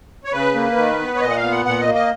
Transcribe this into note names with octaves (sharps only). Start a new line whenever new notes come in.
C#5
C#3 B4
A#3
D#3
B3
C#5
A#2 D#5
F#5
F5
B3
F#5
A#2 F#5
D#5
A#3
D#5